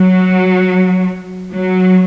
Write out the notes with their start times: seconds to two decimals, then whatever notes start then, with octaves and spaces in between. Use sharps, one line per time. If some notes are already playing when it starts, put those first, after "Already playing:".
Already playing: F#3
1.54 F#3